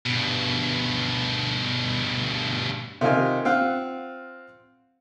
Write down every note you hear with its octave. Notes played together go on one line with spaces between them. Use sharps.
G2 B2
C3 D#3 F4 D#5 G#5
C4 F4 F5 F#5